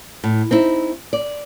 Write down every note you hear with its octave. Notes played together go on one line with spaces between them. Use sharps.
A2
C4 D#4 E4
D5